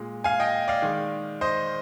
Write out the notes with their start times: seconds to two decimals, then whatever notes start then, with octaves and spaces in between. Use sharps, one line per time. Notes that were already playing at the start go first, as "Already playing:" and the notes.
Already playing: A#2 G#3
0.24 F5 G#5
0.40 D#5 G5
0.68 D5 F5
0.82 D#3 G#3
1.41 C5 D#5